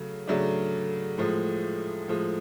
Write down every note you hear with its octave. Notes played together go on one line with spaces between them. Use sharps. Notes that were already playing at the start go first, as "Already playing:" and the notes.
Already playing: C#3 F#3 A3
C#3 F#3 A3 D4
A2 F3 G#3
A2 F3 G#3